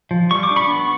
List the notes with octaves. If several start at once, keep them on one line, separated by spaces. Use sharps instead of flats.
F3
G3 C#6
D6
D4
B5 C#6
B3